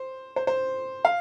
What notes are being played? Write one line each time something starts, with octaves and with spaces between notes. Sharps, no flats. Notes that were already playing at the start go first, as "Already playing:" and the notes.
Already playing: C5
C5
C5
F5